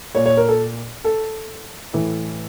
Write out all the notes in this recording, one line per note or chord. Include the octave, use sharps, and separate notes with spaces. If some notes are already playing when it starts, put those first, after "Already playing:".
A#2 C#5
C#5
A#4
A4
A4
A2 E3